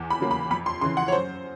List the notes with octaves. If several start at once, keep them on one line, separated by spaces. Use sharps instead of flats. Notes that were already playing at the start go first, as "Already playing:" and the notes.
Already playing: E2
B5
C#3 F#3 A#3
B5
F2 B5
C6
C#3 E3 C6
F#5
C#5
F#2 C5